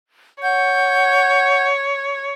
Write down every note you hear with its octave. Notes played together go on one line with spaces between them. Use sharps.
C#5 F#5 G6